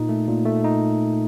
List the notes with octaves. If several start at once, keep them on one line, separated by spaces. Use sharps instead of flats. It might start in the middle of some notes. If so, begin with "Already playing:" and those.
Already playing: A#2 D#4
A3
A#2
A3
D#4